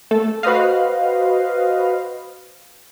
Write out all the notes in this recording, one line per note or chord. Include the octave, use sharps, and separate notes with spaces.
A3 A4
F#4 B4 C5 D#5 F5